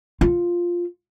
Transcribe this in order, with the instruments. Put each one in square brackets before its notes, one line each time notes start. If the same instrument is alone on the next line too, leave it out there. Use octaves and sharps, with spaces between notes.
[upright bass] F4